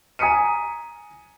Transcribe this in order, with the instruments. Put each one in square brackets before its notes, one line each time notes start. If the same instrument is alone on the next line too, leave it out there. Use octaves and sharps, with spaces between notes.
[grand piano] G#5 A#5 D#6 B6 C#7 D#7